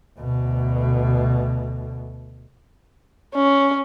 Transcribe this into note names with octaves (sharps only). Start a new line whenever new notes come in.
D2 B2
C#4